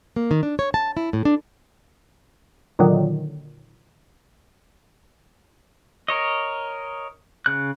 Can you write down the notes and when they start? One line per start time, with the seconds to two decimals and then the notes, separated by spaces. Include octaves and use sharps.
0.16 A#3
0.31 D#3
0.43 D4
0.59 C#5
0.74 A5
0.97 E4
1.13 A2
1.25 D4
2.79 A#2 D3 D#3 F#3
6.08 A#4 C#5 D#5
7.46 C#3 F#6